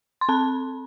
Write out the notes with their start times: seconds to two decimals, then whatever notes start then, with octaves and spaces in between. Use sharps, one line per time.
0.21 C6
0.29 C4 A5